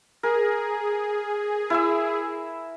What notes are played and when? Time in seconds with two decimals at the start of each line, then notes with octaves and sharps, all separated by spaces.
0.23 G#4 A#4
1.70 E4 G#5 E6